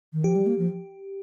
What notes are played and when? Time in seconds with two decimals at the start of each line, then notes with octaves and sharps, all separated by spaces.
0.13 D#3
0.24 F3 G4
0.35 G3
0.47 A#3
0.59 F3